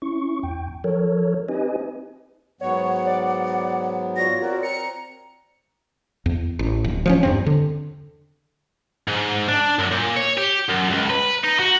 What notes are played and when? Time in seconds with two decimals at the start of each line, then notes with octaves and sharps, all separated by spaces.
0.02 C#4 E4 C#6
0.43 E2 G5
0.84 F3 A4 A#4 C#5
1.49 C4 D#4 G4 B4 D#5 G#5
2.61 G#2 F#3 B3 C#5 F#5
3.06 D5
4.16 F4 F#4 C#5 D5 A#6
4.42 C4 F#4 A#4
4.63 A#5 C#7
6.26 E2
6.59 A1
6.84 D1
7.06 F3 G3 C#4
7.23 E2 G2 C4
7.46 D3
9.08 G#2
9.49 D4
9.79 F#2
9.91 A#2
10.16 C#5
10.37 G4
10.69 F#2
10.89 C#2
11.09 B4
11.44 D#4
11.59 F#4